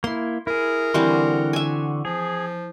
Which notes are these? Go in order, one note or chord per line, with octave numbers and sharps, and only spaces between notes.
A#3 E4 C6
E4 G#4 A#4
D3 E3 G3 C4 F#4 C6
E5 G#5
F3 G#4